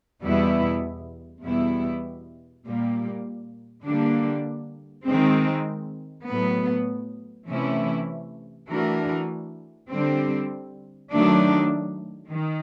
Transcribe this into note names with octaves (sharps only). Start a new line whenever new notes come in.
E2 B2 G3 B3 E4
E2 B2 G3 B3 E4
A#2 G3 A#3
D3 G3 A#3 D4
D#3 G#3 C4
A2 F#3 B3
C3 E3 A3 C#4 E4
E3 A3 D4 F#4 A#4
D3 G3 C4
D#3 F#3 A3 D4
D#3